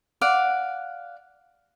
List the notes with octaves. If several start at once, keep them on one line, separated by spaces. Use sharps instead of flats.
D5 F5 F#5